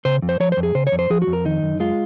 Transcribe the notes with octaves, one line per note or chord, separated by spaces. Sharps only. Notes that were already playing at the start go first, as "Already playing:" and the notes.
C#3 C5
F2
C5
F3 C#5
C5
F2
G#4
C#3 C5
C#5
F2
C5
F3 G#4
F#4
F2
A#4
D#3 D#4
F#2
G#3 F4